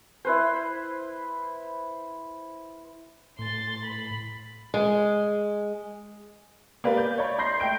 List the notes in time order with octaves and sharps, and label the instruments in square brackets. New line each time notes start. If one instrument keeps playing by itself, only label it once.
[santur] E4 B4 C5
[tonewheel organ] A2 [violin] C6 A6
[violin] B5
[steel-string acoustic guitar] G#3
[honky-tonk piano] A#3 G4 B4 D5
G6
C#5 D5 B5
B5 C6 G6 A#6 C7
A3 G5 G6 D7